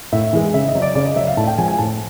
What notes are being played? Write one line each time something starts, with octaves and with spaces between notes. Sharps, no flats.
A2 E5
E3 G#3
C#3 E5
D#5
F#3
D5
C#3 D5
D#5
F#3 E5
F5
A2 A5
G5
F3 G#3 G#5
G#5
A2 A5